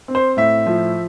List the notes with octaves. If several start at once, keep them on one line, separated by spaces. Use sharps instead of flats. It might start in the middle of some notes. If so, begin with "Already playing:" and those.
C4
C5
A2 E5
F3